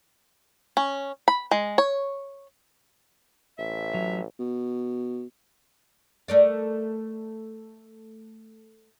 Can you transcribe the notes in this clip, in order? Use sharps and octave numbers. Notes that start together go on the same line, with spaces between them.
C#4
B5
G#3
C#5
A1 E5
F#3
B2
A3 A#4 D5